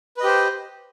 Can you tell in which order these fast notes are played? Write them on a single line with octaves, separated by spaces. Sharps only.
B4 D#5 G4 C5